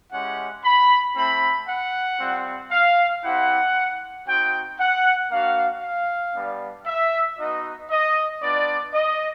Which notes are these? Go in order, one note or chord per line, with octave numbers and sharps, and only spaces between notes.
G#3 C#4 E4 G4 F#5
B5
A3 C4 E4 B5
F#5
G3 C4 F4
F5
C4 E4 G4 F#5
C4 D#4 F#4 G5
F#5
A#3 D4 F#4 F5
F5
G3 B3 D4
E5
B3 D#4 F#4 D#5
D#5
B3 D4 F4 D5
D#5